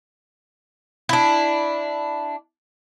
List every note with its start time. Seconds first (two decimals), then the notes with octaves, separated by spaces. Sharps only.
1.09 D4 E4